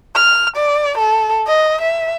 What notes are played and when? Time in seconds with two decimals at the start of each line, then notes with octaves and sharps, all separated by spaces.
0.16 F6
0.57 D5
0.98 A4
1.47 D#5
1.82 E5